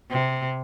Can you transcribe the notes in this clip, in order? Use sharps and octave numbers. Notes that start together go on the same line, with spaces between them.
C3